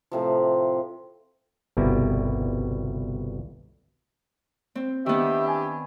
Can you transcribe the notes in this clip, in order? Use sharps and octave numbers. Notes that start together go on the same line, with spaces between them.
A2 C3 F3
G1 C2 B2 G3 E4
C4
D#3 B3 D4 E4 G4 E5
G#5